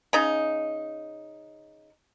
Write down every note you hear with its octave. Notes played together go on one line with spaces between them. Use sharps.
C#3 D#4